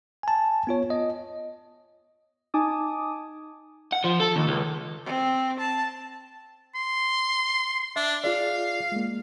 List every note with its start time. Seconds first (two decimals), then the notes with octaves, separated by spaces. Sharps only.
0.23 G#5 A5
0.67 B3 F4 C#5
0.90 D#5
2.54 D#4 G#5 A5 D6 D#6
3.93 F#5
4.04 F3
4.20 A4
4.36 D#2
4.48 C#2
5.05 C4
5.59 A5
6.75 C6
7.96 D4 E5
8.24 F4 G#4 D5 F5
8.92 G#3 A#3